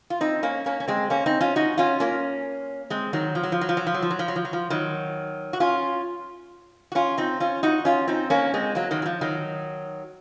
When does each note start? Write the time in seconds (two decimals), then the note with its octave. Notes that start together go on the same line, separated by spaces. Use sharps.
0.10 F4
0.21 C4 D#4
0.43 A#3 C#4
0.66 A#3 C#4
0.80 C#4
0.88 G#3 C4
1.10 A#3 C#4
1.26 C4 D#4
1.41 C#4 F4
1.56 D#4 F#4
1.78 C#4 F4
2.00 A#3 C#4
2.90 G#3 C4
3.13 D#3 F#3
3.35 F3
3.43 F#3
3.52 F3
3.61 F#3
3.69 F3
3.77 F#3
3.87 F3
3.94 F#3
4.02 F3
4.11 F#3
4.19 F3
4.28 F#3
4.36 F3
4.45 F#3
4.53 F3
4.70 D#3 F#3
5.53 F#4
5.60 C#4 F4
6.92 F#4
6.95 C#4 F4
7.18 C4 D#4
7.40 C#4 F4
7.63 D#4 F#4
7.85 C#4 F4
8.08 C4 D#4
8.30 A#3 C#4
8.54 G#3 C4
8.75 F#3 A#3
8.91 D#3 F#3
9.02 F#3
9.06 F3
9.21 D#3 F#3